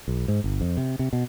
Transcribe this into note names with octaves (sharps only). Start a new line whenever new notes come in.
B1
G#2
G1
F2
C3
C3
B2